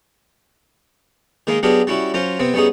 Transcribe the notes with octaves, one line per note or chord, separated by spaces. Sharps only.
D#3 G#3 A#3 D#4
F#3 B3 D4 G4 G#4 F5
G3 C#4 E4 F#4
F#3 C#4 F4 C5
C3 B3 C4
G3 B3 C#4 D#4 G#4